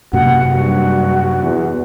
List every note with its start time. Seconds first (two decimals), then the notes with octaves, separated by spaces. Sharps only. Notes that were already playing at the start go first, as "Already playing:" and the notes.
0.13 F#2 C3 A#3 F#4 F#5
0.51 G2 F#4
1.43 E2